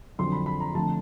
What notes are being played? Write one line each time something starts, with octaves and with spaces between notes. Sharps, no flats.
F2 D3 F#3 C6
B5
B5
A#5
F2 D3 F3 A3 A5